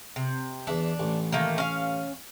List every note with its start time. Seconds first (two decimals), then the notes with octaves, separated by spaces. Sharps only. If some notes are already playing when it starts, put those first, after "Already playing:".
0.16 C3
0.67 E2 D4 E5
1.00 A1
1.32 D#3 A3 A#3
1.58 C#4 F5